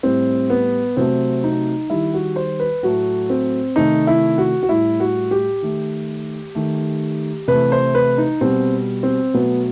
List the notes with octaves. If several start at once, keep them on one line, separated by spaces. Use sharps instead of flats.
A2 G3 C4
B3
C3 F#3 A3 C4
D#4
D#3 G3 E4
F#4
C5
B4
A2 F#3 A3 F#4
C4
C3 D#3 A3 D#4
E4
F#4
F#4
A2 G3 E4
F#4
G4
D#3 A3
D#3 A3
C3 E3 A3 B4
C5
B4
D#4
B2 G3 C4
C4
B2 F#3 A3 B3